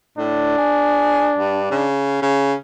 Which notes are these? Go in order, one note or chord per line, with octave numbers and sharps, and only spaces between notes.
A2 D4
G#4
G2
C#3
C#3